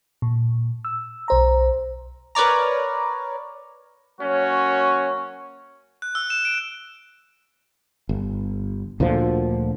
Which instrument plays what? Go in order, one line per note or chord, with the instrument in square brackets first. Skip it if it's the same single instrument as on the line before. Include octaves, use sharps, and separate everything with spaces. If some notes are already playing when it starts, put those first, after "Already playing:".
[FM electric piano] A#2
E6
B1 C5 A#5
[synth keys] A#4 B4 C#5 D5 A#5
[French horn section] F#3 A#3 C#5 [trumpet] C#4 [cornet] F#4
[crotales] F#6
E6
E7
D7
[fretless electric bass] G1
D2 A#2 D3 F3